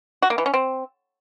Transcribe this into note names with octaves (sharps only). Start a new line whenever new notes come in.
F#4
A#3
E3
C#4
C4